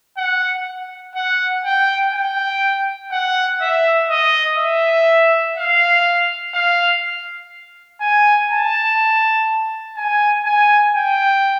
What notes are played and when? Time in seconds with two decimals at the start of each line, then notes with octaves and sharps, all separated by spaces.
0.18 F#5
1.16 F#5
1.65 G5
2.13 G5
3.12 F#5
3.61 E5
4.10 D#5
4.58 E5
5.56 F5
6.54 F5
8.01 G#5
8.50 A5
9.97 G#5
10.45 G#5
10.95 G5